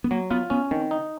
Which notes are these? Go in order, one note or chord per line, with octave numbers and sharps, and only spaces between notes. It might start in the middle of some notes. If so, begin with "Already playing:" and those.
B3
F#3 A#3
B3 F4
B3 C#4
D#3 C4
D#4